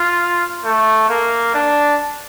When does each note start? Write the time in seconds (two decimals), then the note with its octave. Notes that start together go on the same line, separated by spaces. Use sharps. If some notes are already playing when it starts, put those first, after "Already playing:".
Already playing: F4
0.64 A3
1.09 A#3
1.54 D4